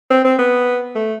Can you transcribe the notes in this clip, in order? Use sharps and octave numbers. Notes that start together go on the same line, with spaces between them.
C4
C4
B3
A3